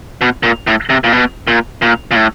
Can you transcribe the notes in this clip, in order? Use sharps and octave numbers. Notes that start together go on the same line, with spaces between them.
B2
A#2
A2
C3
A#2
B2
A#2
A#2
A#2
A2